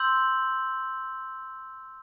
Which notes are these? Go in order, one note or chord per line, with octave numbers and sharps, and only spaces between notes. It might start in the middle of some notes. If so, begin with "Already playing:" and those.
Already playing: C6 E6 G6 F#7